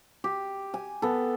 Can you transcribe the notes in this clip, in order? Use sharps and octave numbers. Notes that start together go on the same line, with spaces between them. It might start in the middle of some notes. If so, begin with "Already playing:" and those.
G4
G#5
B3 A4